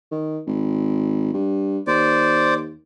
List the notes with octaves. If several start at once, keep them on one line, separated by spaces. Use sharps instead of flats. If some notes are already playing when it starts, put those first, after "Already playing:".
D#3
G#1
G2
D#2 C5 D5